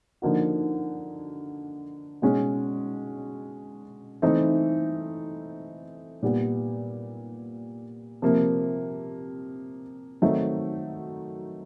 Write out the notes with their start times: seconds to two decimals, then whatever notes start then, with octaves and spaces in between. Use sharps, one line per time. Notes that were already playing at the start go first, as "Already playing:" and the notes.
0.22 D3 F3 A#3 D#4 F#4
2.22 B2 G#3 C#4
4.22 E3 A3 C4 D#4
6.23 A#2 G3 B3
8.22 C3 F3 A#3
10.22 D#3 F#3 A3 C4 D#4